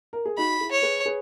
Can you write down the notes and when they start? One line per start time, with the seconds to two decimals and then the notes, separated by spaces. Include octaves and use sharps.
0.13 A#4
0.26 G#4
0.37 D#4 F#4 B5
0.60 E4 G#4
0.72 C#5
0.82 G#4 B4
1.06 G#4 B4